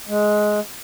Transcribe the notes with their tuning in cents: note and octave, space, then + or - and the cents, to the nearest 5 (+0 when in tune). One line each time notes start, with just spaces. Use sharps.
G#3 +10